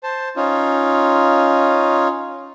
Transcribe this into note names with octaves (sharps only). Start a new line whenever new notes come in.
C5 A5
C#4 D#4 F4